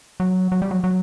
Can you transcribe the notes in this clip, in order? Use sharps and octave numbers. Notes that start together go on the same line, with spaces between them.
F#3
F#3
G3
F#3
F#3